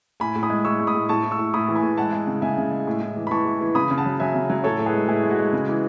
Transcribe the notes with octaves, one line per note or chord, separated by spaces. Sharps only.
A2 G#5 B5
A2
B5 D#6
G#3
A2 C#6 E6
G#3
B5 D#6
A2
A2 A5 C#6
A2
C#6 E6
A2
A2 B5 D#6
E3
G#5 B5
A2
G#3 F#5 A5
G#3
C#3
C#3 E5 G#5
C#3
G#3
A2
A2
E3
B5
E3 A5 C#6
E3
E3
C#3 B5 D#6
C#3
F#5 A5
F#3
F#3 E5 G#5
C#3
F#3
A2 A4 C#5
A2
G#4 B4
G#3
A2 E4 G#4
G#3
F#4
G#3
C#3
E3